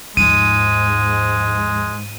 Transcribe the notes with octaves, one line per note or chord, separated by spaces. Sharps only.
D#2 G#2 F3 G#3 D#7